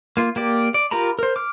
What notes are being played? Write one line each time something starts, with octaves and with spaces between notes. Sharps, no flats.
A#3 F4
A#3 G4 D5
D5
F4 G4 A#4 A#5 B5
A#4 C5
D6 F6